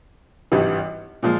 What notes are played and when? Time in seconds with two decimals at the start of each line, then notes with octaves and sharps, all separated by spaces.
0.52 G#1 G2 E3 G3
1.23 A#2 F3 G#3